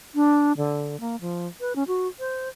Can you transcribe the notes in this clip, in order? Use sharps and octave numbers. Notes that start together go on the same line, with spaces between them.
D4
D3
A#3
F3
B4
C#4
F#4
C5